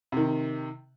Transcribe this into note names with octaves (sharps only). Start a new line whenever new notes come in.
C3 D#3